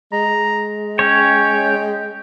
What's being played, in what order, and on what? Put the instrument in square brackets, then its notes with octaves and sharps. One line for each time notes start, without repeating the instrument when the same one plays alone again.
[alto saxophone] G#3 [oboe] A#5
[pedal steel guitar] C#4 C#5 [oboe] G5